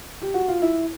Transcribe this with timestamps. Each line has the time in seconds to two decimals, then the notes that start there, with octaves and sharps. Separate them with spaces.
0.22 G4
0.34 F#4
0.48 F4
0.62 E4